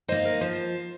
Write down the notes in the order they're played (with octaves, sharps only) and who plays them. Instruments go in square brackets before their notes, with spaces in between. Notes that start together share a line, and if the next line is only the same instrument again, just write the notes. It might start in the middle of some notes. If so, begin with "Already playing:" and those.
[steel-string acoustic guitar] A#3 D#4 [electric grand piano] C5
[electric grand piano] A#4
[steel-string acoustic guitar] F3 [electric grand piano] C5